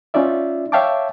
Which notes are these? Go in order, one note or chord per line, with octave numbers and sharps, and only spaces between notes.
C#4 D#4 F4 D5 E5
C#5 E5 F5 G5 A5 D6